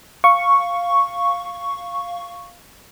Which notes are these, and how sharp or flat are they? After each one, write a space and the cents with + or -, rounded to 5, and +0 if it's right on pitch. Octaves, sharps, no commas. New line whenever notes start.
F5 +0 C#6 +0